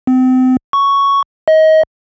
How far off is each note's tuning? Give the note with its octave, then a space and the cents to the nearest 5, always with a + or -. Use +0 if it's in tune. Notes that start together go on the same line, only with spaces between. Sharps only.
C4 -35
C#6 +5
D#5 +25